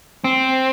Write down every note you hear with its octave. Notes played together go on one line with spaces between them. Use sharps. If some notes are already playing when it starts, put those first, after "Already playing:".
C4